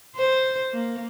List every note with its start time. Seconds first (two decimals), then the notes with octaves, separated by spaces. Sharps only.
0.16 C5
0.72 A#3